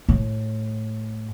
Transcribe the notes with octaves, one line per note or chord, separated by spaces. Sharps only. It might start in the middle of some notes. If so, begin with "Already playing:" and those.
A2